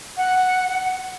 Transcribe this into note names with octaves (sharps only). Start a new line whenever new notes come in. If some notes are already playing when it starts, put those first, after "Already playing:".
F#5